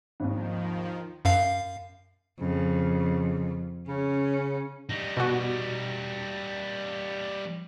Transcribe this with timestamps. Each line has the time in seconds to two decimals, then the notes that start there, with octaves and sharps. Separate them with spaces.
0.20 G#1 D#2 D#3 F3
1.25 F#2 F5 C7
2.40 F2 C#3
3.88 C#3 C#4
4.90 G3 D#4
5.17 B2 F#4